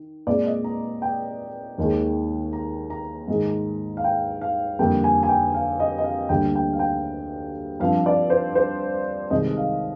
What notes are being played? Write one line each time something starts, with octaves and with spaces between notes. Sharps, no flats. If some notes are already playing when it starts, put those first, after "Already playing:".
Already playing: D#3
A#2 G#3 C4 D5
D#5
A#5
G5
D#2 D#3 G#3
A#5
A#5
G#2 D#3 G#3
F5
G5
F5
F2 D3 G3 A#3 G5
G#5
G#5
G5
F5
D#5
D#5
F5
D2 D3 G3 A#3 G5
G5
F5
G5
G2 F3 C4 F5
D5
C5
C5
C2 C3 D#3 G#3 D#5
F5